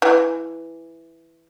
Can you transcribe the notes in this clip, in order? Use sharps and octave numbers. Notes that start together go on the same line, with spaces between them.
E3